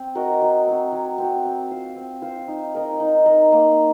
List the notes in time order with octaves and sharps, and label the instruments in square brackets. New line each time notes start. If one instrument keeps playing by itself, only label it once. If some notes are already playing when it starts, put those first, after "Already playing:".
Already playing: [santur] C4
F#4 A#4 D#5
F#3
C4 F#4
F#3
C4 F#4
C4
F4 C5
C4
F4 C5
D#4
A#4 D#5
D#4
A#4 D#5
A#3